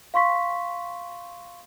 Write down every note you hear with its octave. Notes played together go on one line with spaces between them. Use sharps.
F5 C6 C#6 B6